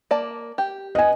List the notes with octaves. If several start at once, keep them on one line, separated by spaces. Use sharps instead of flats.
A#3 D5 A5
G4
B3 D#5 G#5